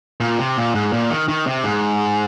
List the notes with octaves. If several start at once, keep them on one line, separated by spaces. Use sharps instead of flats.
A#2
C3
A#2
G#2
A#2
D#3
D#3
C3
G#2